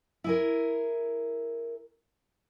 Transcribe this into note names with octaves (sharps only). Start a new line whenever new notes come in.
E4 G#4 A#4